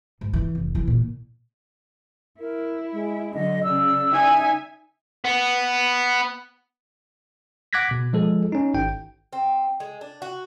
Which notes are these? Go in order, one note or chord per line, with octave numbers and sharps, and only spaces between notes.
G#2
E3
F1
E3
A#2
E4 A#4
G#3
D3 F#3 D#5
C#3 D5 E6
D#4 E5 G#5
B3
F#5 D6 F#6 G#6 A#6 B6
B2
F3 G#3 A4
C#4 D#4
G#1 G5
C4
G#3
D4
F#4